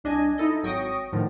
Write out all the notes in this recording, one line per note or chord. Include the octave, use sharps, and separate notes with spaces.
C2 D4 D#5 G#5
D#4 E4 A4 D#5
G#1 F#3 G5 C#6 D#6 A#6
A2 D3 D#3 F3